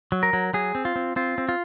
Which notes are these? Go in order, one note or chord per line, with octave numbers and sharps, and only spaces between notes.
F#3
A#4
F#3
F#3 G#4
C4
F4
C4
C4 F4
C4
F4